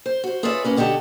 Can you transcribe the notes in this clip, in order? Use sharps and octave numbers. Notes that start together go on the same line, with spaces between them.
C5
F#4 C5
F4 G#4 B4 C#5 D5 E5
A#3 C#4 B4
B2 D3 G4 F#5 A5